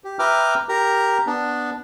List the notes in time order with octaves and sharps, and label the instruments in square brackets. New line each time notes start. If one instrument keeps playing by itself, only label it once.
[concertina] G4
B4 E5 G5 A#5 D6 F6
G4 A#4 A#5
B3 D4